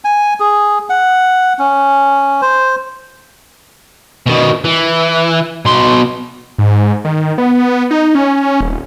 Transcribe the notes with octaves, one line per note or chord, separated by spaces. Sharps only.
G#5
G#4
F#5
C#4
C5
B2 D#3
E3
B2 C6
G#2
D#3
B3
D#4
C#4
D#1